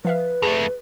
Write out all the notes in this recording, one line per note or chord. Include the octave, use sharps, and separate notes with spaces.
F3 B4 E5 F5
F2 A3 G#4